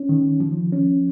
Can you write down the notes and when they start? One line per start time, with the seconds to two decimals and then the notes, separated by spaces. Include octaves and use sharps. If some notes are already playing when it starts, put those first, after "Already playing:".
Already playing: C#4
0.09 D#3
0.40 F3
0.72 C#4